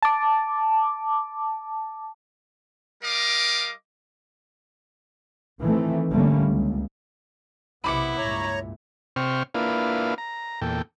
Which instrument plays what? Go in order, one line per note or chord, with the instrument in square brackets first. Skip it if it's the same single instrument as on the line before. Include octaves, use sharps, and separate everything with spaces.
[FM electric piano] A5 D6
[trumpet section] G3 A#4 D#5 F5 D6
[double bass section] D#3 E3 A3 C4
G1 D3 G3 A3 A#3 C#4
C#2
[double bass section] B1 C3 [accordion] B3 [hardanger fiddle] E4 [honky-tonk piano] B5 D6 C#7
[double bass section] C#2 G2 A#2 [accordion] C#5 A#5
[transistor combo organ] C3 C5 G5 C#6 F6
A#3 D4 E4 F4 B4 F5
A#5
E2 A#2 A4 G5